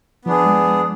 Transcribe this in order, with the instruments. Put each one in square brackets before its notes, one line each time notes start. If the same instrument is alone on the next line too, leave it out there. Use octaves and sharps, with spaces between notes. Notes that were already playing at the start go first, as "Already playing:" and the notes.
[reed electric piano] F3 [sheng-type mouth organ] B3 D4 G#4
[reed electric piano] G#3